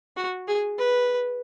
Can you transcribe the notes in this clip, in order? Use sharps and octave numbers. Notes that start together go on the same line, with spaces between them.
F#4
G#4
B4